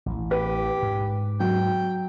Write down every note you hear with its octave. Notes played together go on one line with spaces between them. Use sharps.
A1 E3
G4 B4
G#2
F#3 G5